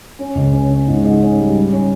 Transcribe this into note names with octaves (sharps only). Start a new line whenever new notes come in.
C#4
C#2
C#4
C#4
G#2
G#2
C#4
G3
G3
C#4